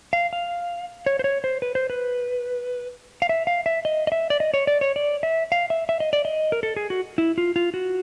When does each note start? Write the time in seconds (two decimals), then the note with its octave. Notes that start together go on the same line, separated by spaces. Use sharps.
0.13 F5
0.33 F5
1.06 C#5
1.19 C5
1.24 C#5
1.44 C5
1.62 B4
1.75 C5
1.90 B4
3.22 F5
3.29 E5
3.47 F5
3.66 E5
3.85 D#5
4.07 D#5
4.12 E5
4.30 D5
4.40 D#5
4.54 C#5
4.67 D5
4.81 C#5
4.96 D5
5.23 E5
5.52 F5
5.70 E5
5.89 E5
6.00 D#5
6.13 D5
6.25 D#5
6.52 A#4
6.63 A4
6.76 G#4
6.90 F#4
7.18 E4
7.38 F4
7.56 F4
7.74 F#4